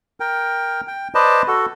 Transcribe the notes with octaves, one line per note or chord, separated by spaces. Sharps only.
A#4 G5
G5
B4 C5 D5 D#5 A5
F#4 A4